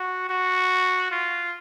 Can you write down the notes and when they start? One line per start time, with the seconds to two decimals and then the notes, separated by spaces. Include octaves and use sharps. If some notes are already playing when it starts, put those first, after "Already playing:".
Already playing: F#4
0.29 F#4
1.11 F4